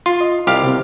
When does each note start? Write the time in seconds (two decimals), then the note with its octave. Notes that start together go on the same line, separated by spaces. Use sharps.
0.06 F4 C6
0.21 D#5
0.47 C2 G4 F5
0.64 C3 C4